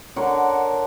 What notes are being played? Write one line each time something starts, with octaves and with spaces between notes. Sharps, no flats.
D3 A#4 C#5 F#5